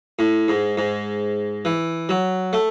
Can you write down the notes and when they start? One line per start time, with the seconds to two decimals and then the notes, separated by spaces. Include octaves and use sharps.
0.19 A2
0.48 G#2
0.78 G#2
1.65 E3
2.09 F#3
2.53 A3